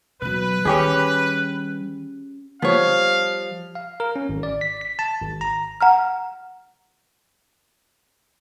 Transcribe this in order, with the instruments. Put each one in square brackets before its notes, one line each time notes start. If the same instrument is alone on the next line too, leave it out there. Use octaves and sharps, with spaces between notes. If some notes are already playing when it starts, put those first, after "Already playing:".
[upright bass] B2 F#3 [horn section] B4
[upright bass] D#3 G3 [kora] C#4 G4 G#4
[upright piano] F3 G3 [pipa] B3 C#5 [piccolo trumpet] F5
[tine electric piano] F5
A#4
C#4
G#1
D5
B6
B6
A5
G#1
A#5
[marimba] F#5 A#5 F6